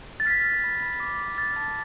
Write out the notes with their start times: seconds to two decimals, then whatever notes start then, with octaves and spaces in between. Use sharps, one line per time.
0.20 A6
0.26 F6 B6
0.44 F6
0.64 B5
0.82 B5
1.00 D6
1.20 B5
1.38 F6 A6
1.56 A5 A6